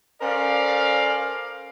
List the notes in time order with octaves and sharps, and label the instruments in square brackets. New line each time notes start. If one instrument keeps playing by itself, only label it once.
[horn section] C#4 A4 A#4 C5 D5 F5